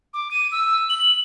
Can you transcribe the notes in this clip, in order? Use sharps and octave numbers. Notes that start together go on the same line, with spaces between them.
D6
D#7
E6
F#7